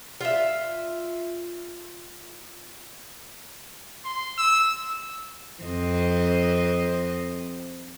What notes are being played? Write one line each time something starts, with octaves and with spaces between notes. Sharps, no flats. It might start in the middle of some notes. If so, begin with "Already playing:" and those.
F4 E5
C6
E6
F2 C4 D#5